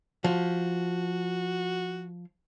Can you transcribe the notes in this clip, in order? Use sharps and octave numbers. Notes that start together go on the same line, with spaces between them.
F3 F#4